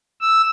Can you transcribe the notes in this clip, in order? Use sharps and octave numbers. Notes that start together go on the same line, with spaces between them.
E6